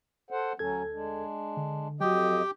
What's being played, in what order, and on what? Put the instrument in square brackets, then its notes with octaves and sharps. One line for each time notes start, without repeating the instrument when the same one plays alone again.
[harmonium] A4 C5 F#5
[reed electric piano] D2 A4 G#6 [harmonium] F#3 C#4
[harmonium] G#3 D4
[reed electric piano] D3
[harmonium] F2 D#5 [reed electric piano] F#3 F#4 [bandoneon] G4 G5